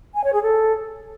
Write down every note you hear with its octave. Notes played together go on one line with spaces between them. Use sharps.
G#5
C#5
G#4
A4